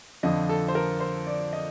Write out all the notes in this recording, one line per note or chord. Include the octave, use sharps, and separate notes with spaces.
F2 D3 F3 D#5
A4
C5
A#4
C5
D5
D#5